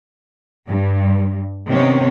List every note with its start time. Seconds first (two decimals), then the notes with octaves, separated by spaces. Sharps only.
0.68 G2
1.68 C3 D#3 B3 C#4